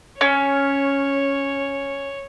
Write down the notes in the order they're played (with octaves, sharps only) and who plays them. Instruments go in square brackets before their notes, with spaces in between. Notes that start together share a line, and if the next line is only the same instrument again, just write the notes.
[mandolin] C#4 [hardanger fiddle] C#5